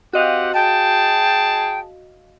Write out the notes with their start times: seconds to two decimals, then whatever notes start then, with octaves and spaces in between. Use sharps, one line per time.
0.13 C4 F#4 G4 D#5 F5 F#5
0.54 G#4 G5 A5